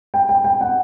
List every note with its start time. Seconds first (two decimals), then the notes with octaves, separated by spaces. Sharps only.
0.14 G5
0.29 G5
0.44 G5
0.61 F#5